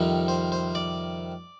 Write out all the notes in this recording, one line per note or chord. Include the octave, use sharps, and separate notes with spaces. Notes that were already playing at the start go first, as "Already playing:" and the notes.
Already playing: F2 C3 D#3 G3
C5
C5
D5